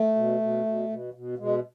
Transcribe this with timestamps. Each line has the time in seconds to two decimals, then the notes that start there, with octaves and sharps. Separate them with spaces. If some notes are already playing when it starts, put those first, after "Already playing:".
Already playing: A3
0.15 B2
0.41 B2
0.66 B2
0.89 B2
1.14 B2
1.38 B2 G#3